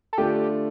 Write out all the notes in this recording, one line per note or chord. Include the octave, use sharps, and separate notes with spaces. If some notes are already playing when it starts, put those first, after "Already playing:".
A4
D3 A3 D4 F4 G4